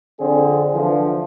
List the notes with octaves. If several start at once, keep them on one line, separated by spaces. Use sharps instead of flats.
F2 D3 C4 G#4
D3 E3 F3